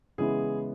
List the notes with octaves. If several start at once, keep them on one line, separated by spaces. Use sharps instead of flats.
C#3 E3 G#3 B3 E4 G#4